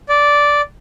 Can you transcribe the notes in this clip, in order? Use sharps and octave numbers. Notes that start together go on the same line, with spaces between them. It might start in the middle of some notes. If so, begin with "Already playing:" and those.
D5